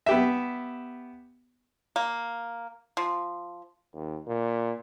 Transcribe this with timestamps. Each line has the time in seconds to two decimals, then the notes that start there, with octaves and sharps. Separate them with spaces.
0.06 B3 G4 E5
1.96 A#3
2.97 F3
3.94 D#2
4.27 A#2